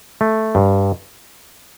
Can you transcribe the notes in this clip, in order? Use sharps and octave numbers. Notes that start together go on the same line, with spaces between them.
A3
G2